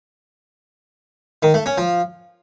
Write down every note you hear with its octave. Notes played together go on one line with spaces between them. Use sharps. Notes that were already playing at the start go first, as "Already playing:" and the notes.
D#3
A3
C#4
F3